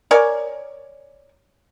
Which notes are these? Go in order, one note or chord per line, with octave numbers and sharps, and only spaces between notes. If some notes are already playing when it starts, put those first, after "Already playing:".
A#4 C#5 D5 G#5